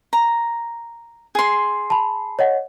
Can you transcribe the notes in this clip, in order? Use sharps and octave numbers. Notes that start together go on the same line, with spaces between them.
A#5
G#4 C6
A5 B5
C#5 D#5 F#5